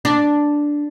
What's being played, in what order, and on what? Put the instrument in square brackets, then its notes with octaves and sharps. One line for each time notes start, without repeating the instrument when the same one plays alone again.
[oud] D4